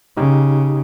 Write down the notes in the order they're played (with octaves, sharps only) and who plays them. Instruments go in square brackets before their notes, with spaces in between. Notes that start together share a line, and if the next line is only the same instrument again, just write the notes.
[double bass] C#3 [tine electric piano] D#4 G4